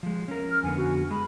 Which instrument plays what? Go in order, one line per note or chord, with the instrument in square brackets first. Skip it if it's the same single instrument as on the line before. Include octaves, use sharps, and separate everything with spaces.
[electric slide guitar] F3 G#3
C#4 A#4
[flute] F6
[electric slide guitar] F2 D3 B3 [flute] G#5
[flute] F#4
[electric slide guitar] G#3 [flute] B5